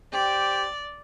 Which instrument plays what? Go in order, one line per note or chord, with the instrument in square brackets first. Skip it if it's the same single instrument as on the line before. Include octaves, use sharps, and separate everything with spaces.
[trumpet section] G4 C5 G5 [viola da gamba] D5